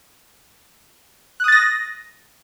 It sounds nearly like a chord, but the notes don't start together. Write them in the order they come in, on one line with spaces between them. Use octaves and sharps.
F#6 D#6 A6 A#6